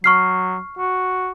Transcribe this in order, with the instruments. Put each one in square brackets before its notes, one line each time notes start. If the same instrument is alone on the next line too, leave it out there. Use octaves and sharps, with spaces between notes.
[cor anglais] F#3 [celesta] C#6 F6 C7
[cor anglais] F#4